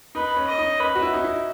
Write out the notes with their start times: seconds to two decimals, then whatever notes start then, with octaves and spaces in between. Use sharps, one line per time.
0.15 D#4 B4
0.36 C#4
0.48 D#5
0.58 D#4
0.80 C#4 B4
0.95 F#4
1.02 E4
1.13 D#4
1.24 E4